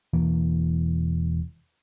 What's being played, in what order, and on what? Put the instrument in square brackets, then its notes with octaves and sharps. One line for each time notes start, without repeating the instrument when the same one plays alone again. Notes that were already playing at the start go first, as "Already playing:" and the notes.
[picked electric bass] E1 E3 A#3